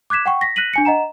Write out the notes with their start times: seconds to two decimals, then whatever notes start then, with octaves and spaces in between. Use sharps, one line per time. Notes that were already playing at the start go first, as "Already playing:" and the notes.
0.10 D6 F#6 G#6 B6 E7
0.26 F#5 G5 C#6
0.41 A#6 B6
0.56 F#6 A#6 B6 D#7 F#7
0.73 D4 G#5 C#7
0.85 D#5 F#5 A#5 E7